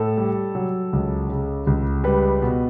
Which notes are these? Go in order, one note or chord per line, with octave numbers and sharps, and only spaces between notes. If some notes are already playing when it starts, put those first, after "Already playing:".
Already playing: A2 A4
G3
F#3
C#2
C#3
C#2
G3 B4
B2